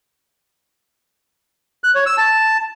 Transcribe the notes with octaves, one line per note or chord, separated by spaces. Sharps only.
F#6
C#5
E6
A5